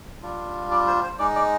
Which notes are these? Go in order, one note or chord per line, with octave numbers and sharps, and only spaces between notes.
G3 D4 F4
D5
C5
C5
G#3 D#4 D5
D5